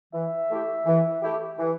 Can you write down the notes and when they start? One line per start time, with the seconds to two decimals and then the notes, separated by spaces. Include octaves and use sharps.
0.13 E3 E5
0.49 A3 E4 G4
0.87 E3
1.23 A3 E4 G4
1.58 E3